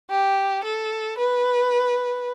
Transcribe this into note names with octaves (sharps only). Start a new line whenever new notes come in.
G4
A4
B4